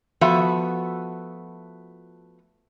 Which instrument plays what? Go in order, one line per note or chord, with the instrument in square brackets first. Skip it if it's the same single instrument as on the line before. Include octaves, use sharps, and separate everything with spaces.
[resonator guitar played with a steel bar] F3 A3 B3 F#4 E5